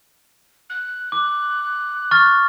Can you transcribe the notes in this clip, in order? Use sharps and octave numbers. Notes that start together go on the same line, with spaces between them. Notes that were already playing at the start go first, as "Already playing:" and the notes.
F#6
D6
C#6 F6 A6